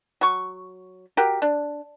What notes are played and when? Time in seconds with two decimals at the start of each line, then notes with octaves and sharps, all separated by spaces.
0.21 F#3 C#6
1.17 F#4 G4 A#4
1.42 D4